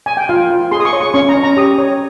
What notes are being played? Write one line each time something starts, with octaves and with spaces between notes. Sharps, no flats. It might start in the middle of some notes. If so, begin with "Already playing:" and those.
G#5
G5
F4 F5
F4
G#4 C6
D#6
C#6
C#5
C#6
C#4 C#6
A#5
C#4
A#5
G4 D#6
C#5